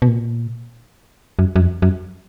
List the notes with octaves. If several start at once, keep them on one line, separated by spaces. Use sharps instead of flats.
B2
A#2
F#2
F#2
F2
F#2